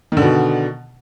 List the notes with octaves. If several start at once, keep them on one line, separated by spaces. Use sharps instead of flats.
B2 D3 D#3